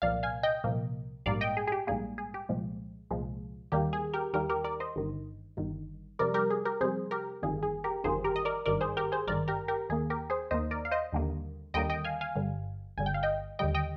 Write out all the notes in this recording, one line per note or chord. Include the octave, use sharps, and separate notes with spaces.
C2 A#2 F3 A#3 D5 F5
F5 G#5
D#5 G5
C2 A#2 F3 A#3
A#1 G#2 G3 A#3 D5 F5
D#5 G5
G#4
G#4
G4
A#1 G#2 G3 A#3 G#4
G#4
G4
C2 A#2 F3 G#3
C2 A#2 F3 G#3
D#2 D#3 G3 A#3 G4
G#4
G4 A#4
D#2 D#3 G3 A#3 G4 A#4
G4 A#4
A#4 D5
C5 D#5
G1 G2 D#3
G1 G2 D#3
F2 C3 G3 A#4 D5
G4 A#4
G#4
G4 A#4
F2 C3 G3 G#4 C5
G4 A#4
G1 F2 D#3 G3 A#3 G#4
G#4
G4 A#4
G1 F2 D#3 G3 A#3 G#4 C5
G4 A#4
D#5
A#4 D5
G#1 G2 D#3 A#4 D5
G#4 C5
G4 A#4
G#4 C5
G#1 G2 D#3 A#4 D5
G4 A#4
G4 A#4
D#2 D#3 A#3 G#4
G4 A#4
G#4 C5
D#2 D#3 A#3 C5 D#5
A#4 D5
F5
C5 D#5
D#2 D3 G3 A#3
D#2 D3 G3 A#3 D#5 G5
D#5 G5
F5 G#5
F5 G#5
G1 G2 D3 G3
G1 G2 D3 G3 G#5
G5
F5
D#5 G5
D#2 D3 G3 D#5 G5
D#5 G5